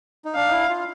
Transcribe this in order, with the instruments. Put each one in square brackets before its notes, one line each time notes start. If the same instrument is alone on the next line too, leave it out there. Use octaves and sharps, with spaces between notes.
[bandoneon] D#4
[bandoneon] D4 [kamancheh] F5
[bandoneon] D#4
E4
F4